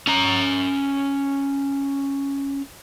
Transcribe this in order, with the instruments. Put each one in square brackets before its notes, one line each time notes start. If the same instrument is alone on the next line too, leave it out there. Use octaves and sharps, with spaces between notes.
[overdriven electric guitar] C#4 A#5